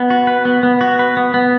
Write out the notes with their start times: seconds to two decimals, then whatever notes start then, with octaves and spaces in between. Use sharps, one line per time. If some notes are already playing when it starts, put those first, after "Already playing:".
Already playing: B3
0.10 F#4
0.27 B4
0.45 B3
0.63 B3
0.81 F#4
0.99 B4
1.17 B3
1.34 B3